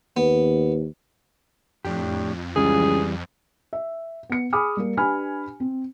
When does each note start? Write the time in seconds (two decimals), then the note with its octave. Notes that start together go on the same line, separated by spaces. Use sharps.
0.17 D#2 B3
1.85 F2 A2 D4 G4
2.56 C#2 E3 G3 G#4
3.73 E5
4.30 B3 C#7
4.53 G#4 G#5 B5 D6 D#6 F6
4.77 G3 A#3
4.97 D4 G4 B4 G#5 B5 F6
5.60 C4